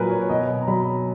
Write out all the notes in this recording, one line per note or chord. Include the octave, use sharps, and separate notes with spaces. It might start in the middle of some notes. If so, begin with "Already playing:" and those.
Already playing: A#2 F#3 A#4 B4 G#5
C#5
C#5
B2 D#5
A#5
F#3 B5